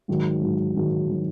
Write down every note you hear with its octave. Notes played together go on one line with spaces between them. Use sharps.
G#2 D#3 F#3
G#2 D#3 F#3
G#2 D#3 F#3
D#3 F#3